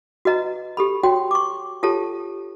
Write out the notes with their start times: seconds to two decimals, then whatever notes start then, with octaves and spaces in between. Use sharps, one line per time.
0.25 F#4 B4 D#5 A#5
0.77 G4 A4 B5
1.03 F#4 C#5 G5 C6
1.31 C#6 D6
1.83 F4 G4 A4 C#5 A5